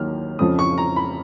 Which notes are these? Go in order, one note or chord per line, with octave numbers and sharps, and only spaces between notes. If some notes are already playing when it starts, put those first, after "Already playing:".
Already playing: D#2 D#3 F#3 F6
F2 C#3 F3 D#6
C#6
A#5
B5